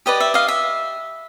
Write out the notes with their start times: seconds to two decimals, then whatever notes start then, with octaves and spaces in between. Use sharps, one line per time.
0.06 G4 B4 D5 D#5
0.20 E5
0.34 D#5 F5
0.48 E5